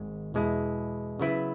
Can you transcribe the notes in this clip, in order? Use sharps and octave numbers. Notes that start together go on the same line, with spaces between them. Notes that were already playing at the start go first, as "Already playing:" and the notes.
Already playing: G#1 G#2 G#3
E2 B2 G#3 E4
C#3 F#3 B3 E4 B4